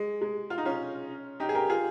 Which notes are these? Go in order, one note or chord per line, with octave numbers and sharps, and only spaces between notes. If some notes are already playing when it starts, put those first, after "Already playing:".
Already playing: G#3
G#3
F4
D#4
C#4 F4
D#4 G4
G#4
G4 A#4
F4 G#4